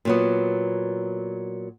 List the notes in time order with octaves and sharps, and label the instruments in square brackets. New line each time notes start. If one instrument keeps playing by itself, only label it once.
[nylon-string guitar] A#2 F#3 B3